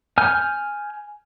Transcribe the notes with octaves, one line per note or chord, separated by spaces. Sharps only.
G#5 F6 G6